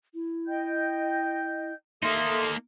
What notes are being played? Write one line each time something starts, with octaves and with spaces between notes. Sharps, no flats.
E4
D#5 G5 G6
A#3 D#4 A4 E5 C6 D#6